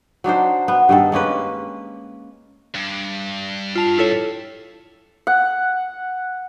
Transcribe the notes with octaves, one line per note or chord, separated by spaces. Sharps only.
F#3 D4 D#4 C5
B3
G2 D#3 A4
G#3 A#3 C#4 B4
G2
F4 A5 F7
E4 A4 C#5
F#5